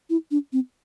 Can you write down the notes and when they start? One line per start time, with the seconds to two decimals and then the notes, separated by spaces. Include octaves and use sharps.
0.10 E4
0.31 D4
0.53 C4